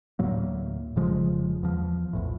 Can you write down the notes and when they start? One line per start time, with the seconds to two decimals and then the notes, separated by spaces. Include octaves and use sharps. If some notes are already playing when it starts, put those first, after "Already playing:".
0.19 D2 A2 F#3 A#3
0.96 F1 C#3 F3 G#3
1.63 E2 F3
2.13 A#1 E2 A2